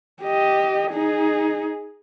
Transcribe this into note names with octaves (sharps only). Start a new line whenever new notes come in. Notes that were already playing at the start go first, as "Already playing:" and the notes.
G4 D#5
D#4 G#4